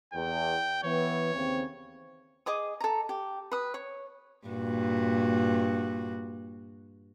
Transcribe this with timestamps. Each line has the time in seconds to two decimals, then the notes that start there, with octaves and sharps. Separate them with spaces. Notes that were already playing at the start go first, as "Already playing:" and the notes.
0.14 E2 G5
0.84 E3 B3 C#5
1.33 D#2 C#3 C4
2.46 G#4 D#5 D6 D#6
2.80 A4 A#5
3.09 G4
3.52 B4 D#6
3.74 C#5
4.47 G2 A#2 F#4